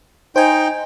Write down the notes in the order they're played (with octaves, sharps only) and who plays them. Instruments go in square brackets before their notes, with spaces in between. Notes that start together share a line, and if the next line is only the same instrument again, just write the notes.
[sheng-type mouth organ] D#4 G5 [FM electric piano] C5 G#5